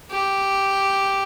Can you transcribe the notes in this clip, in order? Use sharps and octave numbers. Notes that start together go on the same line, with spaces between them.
G4